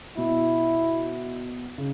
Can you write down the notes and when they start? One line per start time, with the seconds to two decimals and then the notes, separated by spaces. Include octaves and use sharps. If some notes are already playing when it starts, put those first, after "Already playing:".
0.17 B2 E4
1.78 C#3